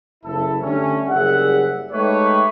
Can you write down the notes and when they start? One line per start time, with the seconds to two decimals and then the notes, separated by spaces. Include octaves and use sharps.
0.24 F#1 E4 A4
0.62 D3 G3 A3 C#4
1.08 F#1 G3 G#4 E5 F#5
1.92 G#3 A3 D#4 G4 B4 C#5